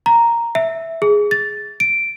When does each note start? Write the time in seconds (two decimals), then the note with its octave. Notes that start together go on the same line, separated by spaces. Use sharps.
0.06 A#5
0.55 E5
1.02 G#4
1.31 A6
1.80 D7